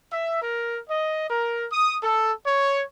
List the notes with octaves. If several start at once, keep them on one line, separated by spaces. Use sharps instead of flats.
E5
A#4
D#5
A#4
D#6
A4
C#5